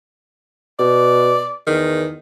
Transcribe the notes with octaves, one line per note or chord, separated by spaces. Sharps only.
B2 D5
E2 D#3